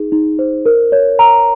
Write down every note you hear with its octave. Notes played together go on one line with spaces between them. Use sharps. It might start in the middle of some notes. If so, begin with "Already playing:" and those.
Already playing: D#4 G#4
D#4
C5
A#4
C#5
A#5